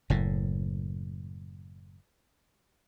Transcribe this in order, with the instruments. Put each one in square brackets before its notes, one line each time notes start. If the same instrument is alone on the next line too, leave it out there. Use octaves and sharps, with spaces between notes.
[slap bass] F#1 A2